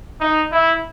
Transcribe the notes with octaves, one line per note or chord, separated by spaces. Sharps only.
D#4
E4